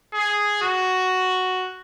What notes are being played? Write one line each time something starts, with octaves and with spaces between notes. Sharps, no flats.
G#4
F#4